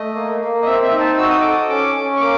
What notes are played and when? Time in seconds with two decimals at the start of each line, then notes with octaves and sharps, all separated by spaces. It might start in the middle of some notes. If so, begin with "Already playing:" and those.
Already playing: A3 D#5
0.15 A#3
0.40 A#3
0.62 D#5
0.66 C4 E5
0.83 E5
0.92 D#4
1.00 A5
1.17 F#4 E6
1.29 D#6
1.41 A4 D6
1.52 D#6
1.69 C#4 D6
1.95 C#4
2.16 C#6
2.21 A#3 D6